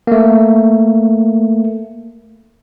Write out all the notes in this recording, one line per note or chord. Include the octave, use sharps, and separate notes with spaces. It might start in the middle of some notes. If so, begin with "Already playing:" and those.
A3 A#3